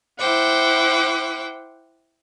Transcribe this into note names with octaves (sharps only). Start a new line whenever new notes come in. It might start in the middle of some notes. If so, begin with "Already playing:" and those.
E4 C5 F#5 G5 D6